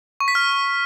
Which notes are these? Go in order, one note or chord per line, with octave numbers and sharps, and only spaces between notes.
C#6
B6
F6